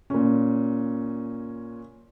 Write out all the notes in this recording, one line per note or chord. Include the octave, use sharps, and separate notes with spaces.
A#2 C#4